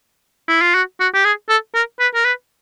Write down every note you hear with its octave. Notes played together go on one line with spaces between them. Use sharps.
E4
F4
F#4
F#4
G4
G#4
A4
A#4
B4
A#4
B4